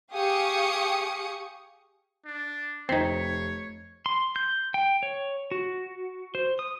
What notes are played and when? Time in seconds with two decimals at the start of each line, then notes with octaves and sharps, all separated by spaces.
0.13 G4 G#4 F5 C#6 D#6 C#7
2.26 D4
2.89 F1 C4 D#4 C#5 B6 C7
4.06 C6
4.36 G6
4.74 G5
5.03 C#5
5.51 F#4
6.35 C5
6.59 D#6